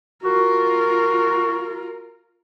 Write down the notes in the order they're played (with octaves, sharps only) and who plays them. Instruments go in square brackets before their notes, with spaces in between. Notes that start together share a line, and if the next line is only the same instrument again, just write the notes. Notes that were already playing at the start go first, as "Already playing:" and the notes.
[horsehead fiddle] F4 A#4 [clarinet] F#4